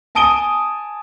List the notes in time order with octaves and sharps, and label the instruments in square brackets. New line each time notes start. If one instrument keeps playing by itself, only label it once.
[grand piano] G#5 A5 D#6 D7 D#7 G7